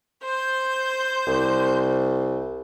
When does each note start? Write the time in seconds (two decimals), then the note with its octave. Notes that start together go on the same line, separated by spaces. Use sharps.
0.23 C5 G6
1.27 C2